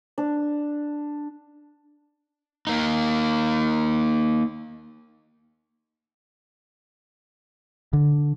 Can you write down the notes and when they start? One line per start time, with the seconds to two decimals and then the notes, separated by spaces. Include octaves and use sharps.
0.18 D4
2.67 A#3 D#4
7.93 D3